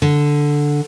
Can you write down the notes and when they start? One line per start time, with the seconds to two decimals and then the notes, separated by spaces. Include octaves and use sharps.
0.02 D3